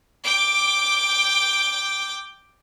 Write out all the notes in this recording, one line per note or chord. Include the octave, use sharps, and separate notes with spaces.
G5 D6